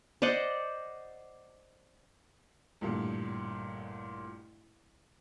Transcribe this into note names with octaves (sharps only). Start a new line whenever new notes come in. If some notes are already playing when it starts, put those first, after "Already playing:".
C5 D5 D#5 F#5
A1 G2 A#2 D3